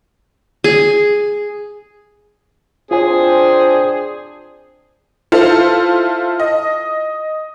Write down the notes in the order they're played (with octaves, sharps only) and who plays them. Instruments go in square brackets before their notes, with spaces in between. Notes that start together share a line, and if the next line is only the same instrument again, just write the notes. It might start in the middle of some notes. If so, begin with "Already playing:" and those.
[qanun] G#4
[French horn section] C4 D4 C5 [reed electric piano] F4 G#5 [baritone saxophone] G#4
[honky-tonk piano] E4 F4 A4 C5
D#5